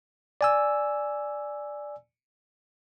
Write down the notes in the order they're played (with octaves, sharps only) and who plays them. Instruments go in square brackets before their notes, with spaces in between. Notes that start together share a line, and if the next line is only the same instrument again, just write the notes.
[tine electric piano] D5 G#5 E6